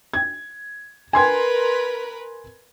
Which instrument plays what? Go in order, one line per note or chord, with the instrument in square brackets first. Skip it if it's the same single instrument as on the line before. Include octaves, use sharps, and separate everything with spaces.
[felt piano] G#6
[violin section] A#4 B4 [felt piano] G#5 C6 G#6